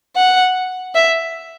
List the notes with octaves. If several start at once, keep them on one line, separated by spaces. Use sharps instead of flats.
F#5
E5